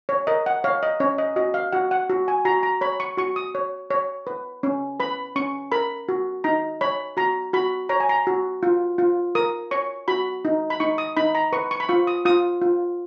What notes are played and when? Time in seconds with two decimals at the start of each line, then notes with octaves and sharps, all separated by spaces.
0.09 C#5
0.27 A#4 D#5
0.46 F#5
0.64 C#5 F5
0.83 D#5
1.00 C#4 C#5
1.18 D#5
1.36 F#4 D#5
1.54 F5
1.72 F#4 F#5
1.91 F#5
2.10 F#4
2.28 G#5
2.45 F#4 A#5
2.63 A#5
2.81 C#5 B5
3.00 C#6
3.17 F#4 C#6
3.36 D#6
3.55 C#5
3.90 C#5
4.27 B4
4.63 C#4
5.00 B4 B5
5.36 C#4 C#6
5.72 A#4 B5
6.09 F#4
6.44 D#4 A#5
6.81 C#5 B5
7.17 F#4 A#5
7.53 F#4 B5
7.89 C#5 A#5
8.00 G#5
8.09 A#5
8.27 F#4
8.63 F4
8.98 F4
9.35 A#4 D#6
9.71 C#5 C#6
10.08 F#4 B5
10.45 D#4
10.70 B5
10.80 D#4 C#6
10.98 D#6
11.17 D#4 B5
11.35 A#5
11.53 B4 C#6
11.71 C#6
11.80 B5
11.89 F4 C#6
12.07 D#6
12.25 F4 D#6
12.62 F4